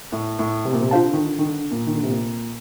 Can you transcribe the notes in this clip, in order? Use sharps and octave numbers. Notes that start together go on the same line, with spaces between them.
A2
A2
C3
A#2
C3
D3 F4 C5 F5 A5
D#3
D3
D#3
D3
A#2
D#3
D3
C3
A#2